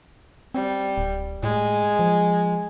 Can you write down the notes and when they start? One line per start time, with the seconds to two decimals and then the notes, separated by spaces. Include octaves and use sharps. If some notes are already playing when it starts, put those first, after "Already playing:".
0.54 G3 C4
0.98 D1
1.43 A2 G#3
1.99 F3